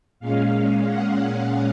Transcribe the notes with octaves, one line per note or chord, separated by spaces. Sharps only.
A#2 G#3 C#4 F5
F#5